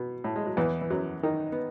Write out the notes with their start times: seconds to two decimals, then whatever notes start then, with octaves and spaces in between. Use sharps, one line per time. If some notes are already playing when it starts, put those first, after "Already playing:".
Already playing: B2
0.24 A2
0.36 G#3
0.47 F#3
0.57 E2 E3
0.81 E3
0.90 F#2 F#3
1.23 D#3 D#4
1.52 B3